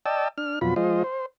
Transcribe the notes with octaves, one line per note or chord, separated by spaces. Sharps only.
D5 D#5 G5 A5 E6
D4 F6
F2 B2 F#3 F4 B5
F3 G#3 F4 C5 D#5
C5